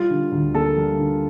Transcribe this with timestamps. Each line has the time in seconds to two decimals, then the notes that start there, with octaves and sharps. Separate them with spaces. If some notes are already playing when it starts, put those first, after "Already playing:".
Already playing: G3 F4
0.10 D3
0.32 D2
0.54 A#3 A4
0.77 G3
0.98 D3